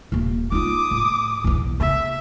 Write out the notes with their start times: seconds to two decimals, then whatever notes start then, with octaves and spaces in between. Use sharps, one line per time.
0.12 D#1 A#3
0.52 D#4 F4 D6 D#6
0.91 A2
1.44 B1 E2
1.80 C#3 E5